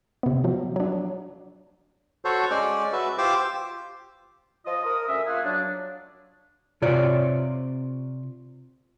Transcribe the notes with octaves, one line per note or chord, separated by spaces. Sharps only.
C3 B3
F3 F#3
F#3 D4
F#4 A4 C5 C#5
G#3 C#4 D5
F#4 B4 E5
F4 G4 C5 D6 E6
F3 F4 D#5
A#4 D#6
D2 C#4 E5
A#3 F4 F#4 G#4 F5
F#3 D4
C3 F4 C#5 D5